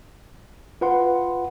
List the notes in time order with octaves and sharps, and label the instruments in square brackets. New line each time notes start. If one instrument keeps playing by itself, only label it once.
[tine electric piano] F4 B4 F#5 C6